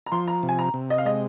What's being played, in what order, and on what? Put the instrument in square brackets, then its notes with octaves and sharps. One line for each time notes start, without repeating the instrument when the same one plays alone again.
[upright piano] A#5
[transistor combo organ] F3 [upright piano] C6
[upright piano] A#5
[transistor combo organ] C3
[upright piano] G#5
A#5
[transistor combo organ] C3
[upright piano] D#5
F5
[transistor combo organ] G#3 [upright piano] D#5